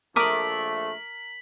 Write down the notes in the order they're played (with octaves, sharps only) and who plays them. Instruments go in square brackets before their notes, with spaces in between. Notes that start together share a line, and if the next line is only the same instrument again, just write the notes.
[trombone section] A#1 A3 [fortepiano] A#4 [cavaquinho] D6 D#6 [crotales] B6 F#7